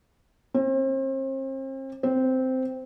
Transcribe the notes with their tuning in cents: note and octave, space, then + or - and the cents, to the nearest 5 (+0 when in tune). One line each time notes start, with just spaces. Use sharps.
C4 +40
C4 -10